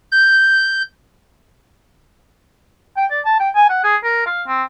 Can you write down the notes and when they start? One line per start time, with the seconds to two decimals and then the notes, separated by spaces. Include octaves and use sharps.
0.12 G6
2.97 G5
3.11 D5
3.25 A5
3.40 G5
3.56 G#5
3.70 F#5
3.84 G#4
4.04 A#4
4.26 F5
4.48 C4